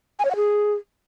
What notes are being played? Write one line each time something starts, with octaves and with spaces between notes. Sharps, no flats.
G#5
C#5
F#5
G#4